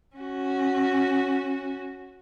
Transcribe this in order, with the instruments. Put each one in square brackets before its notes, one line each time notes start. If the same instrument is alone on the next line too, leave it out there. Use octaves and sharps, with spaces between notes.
[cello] C#4 F#4